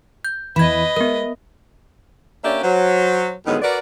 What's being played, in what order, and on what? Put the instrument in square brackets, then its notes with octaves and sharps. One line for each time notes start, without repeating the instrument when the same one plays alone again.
[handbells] G6
[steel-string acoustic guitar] E2 E3 [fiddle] B4 D#5 [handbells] B5 G#6
[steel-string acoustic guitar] G#3 [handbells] B3 A#4
[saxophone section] A#3 C#4 D4 G4 D5 E5
F#3 C5
A2 D3 D#3 F#3 G#3 B3
F#4 A#4 B4 D5